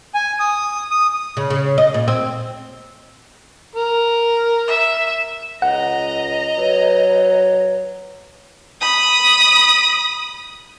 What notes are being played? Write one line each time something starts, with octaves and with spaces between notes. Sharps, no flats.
G#5
D#6
D#6
C#3
C#3
D#5
A#2
C4
A#4
E5
C#2 D#5 F#5 A#5
F#3 B4
B5 D#6